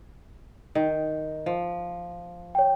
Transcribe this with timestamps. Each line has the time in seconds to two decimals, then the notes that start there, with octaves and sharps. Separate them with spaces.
0.75 D#3
1.46 F3
2.55 C#5 G5